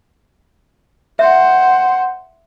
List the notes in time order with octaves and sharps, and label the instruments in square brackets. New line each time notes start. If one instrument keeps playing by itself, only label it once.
[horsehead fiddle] C5 F#5 [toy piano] E5